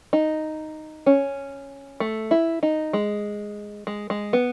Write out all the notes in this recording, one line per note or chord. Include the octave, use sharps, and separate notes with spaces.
D#4
C#4
A3
E4
D#4
G#3
G#3
G#3
B3